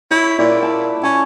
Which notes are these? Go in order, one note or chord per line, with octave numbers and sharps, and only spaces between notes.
E4 C#5
A#2 E4 D5
A5
C#4 A5